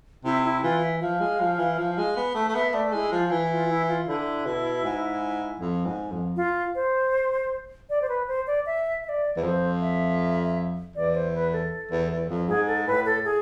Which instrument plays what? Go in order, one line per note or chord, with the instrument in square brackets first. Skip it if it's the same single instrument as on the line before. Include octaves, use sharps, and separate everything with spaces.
[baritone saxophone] C3 [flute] E4
[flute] E4
[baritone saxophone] E3 [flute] F4
[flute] E5
[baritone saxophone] F3 [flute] F5
[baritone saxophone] G#3
F3
E3
F3
G#3
B3
A3
A3
[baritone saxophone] B3 [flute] E5
[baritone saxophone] A3 [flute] D5
[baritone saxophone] G#3 [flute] E4
[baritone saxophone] F3 [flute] F4
[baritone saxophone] E3 [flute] E4
[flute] F4
E4
F4
[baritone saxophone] D3 [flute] E4
[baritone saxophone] B2
G#2
F2
G#2
F2
[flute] F4
C5
D5
C5
B4
C5
D5
E5
E5
D5
[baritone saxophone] E2
[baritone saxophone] F2 [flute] C5
[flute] E5
[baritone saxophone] E2 [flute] D5
[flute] C5
B4
A4
[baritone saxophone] E2
E2
F2
[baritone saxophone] G#2 [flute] G#4
[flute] A4
[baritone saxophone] A2 [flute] B4
[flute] A4
G#4